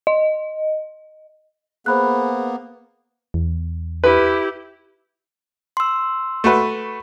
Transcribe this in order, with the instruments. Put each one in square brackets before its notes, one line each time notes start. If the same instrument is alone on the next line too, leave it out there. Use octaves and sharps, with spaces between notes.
[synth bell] D#5
[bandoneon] A#3 B3 [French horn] G#4 [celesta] C5 B5 F#6
[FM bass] E2
[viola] E4 G4 [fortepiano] B4
[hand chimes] C6 E6
[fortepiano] A3 F#4 B4